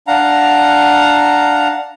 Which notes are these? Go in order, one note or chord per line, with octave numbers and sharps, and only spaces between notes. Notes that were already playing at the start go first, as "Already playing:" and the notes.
D4 F5 F#5 A#5